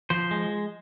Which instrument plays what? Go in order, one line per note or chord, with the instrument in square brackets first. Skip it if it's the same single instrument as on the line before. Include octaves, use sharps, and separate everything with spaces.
[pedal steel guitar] F3 C5
G#3